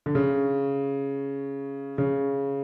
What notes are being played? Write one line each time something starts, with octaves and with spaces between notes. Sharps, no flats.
D3
C#3
C#3